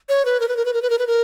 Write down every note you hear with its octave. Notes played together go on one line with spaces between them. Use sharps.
C#5
B4
A#4
B4
A#4
B4
A#4
B4
A#4
B4
A#4